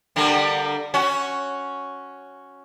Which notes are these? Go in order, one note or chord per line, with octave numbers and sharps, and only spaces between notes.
D3 G3 A#3
C#4 F#4